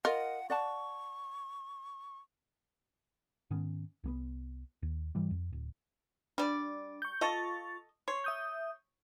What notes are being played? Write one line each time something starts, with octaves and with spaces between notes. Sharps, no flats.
F4 A#4 D#5 F#5
D5 F#5 A5 C#6
G#2 D#3 B3 C#4
C2 A#3 B3
D#2
G#2 E3 G3
F2
D1
G3 D4 D5
C#6 G6
F4 A4 D#5 C#6 A6
C#5 C6
E5 D#6 G6